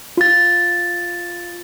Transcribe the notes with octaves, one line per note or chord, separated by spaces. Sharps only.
F4 A6